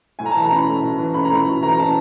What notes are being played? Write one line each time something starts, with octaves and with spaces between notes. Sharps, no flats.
A2 G#5
A#5
E3 A5
A#5
C#4 B5
A3
A2
E3
C#4 B5
A#5
A3 B5
A2
E3 A#5
A#5
C#4 A5